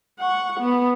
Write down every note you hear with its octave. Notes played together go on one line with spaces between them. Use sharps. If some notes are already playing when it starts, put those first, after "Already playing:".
F#5 C#6
B3